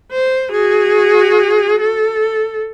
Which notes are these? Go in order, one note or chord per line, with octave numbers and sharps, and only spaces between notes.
C5
F#4 G#4
A4